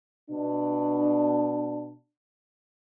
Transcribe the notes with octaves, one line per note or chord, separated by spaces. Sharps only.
B2 D4